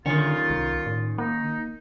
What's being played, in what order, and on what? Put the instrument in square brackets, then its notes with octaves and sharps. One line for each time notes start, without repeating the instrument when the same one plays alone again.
[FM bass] D3 [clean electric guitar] D#3 C#4 [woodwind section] A#3 D#4 F4
[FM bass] C2
A2
[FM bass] A#3 [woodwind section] D#4